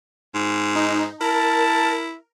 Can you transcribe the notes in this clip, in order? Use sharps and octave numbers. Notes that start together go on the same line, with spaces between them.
G#2
D#4
E4 A#4 A5